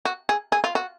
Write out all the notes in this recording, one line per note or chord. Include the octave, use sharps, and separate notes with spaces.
F#4
G#4
G#4
F4
F#4